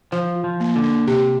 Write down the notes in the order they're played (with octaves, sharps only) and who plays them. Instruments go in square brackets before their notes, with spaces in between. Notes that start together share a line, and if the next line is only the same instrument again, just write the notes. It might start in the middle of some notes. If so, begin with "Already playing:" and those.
[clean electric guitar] F3 [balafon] C5
[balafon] F4
[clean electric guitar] F3
[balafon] A#3
[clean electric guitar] D3
[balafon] A#3
[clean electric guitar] C3 [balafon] G4